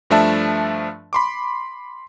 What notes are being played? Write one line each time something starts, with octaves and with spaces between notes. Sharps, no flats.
G2 F3 A3 D4 E5 A5
B5 C6 D6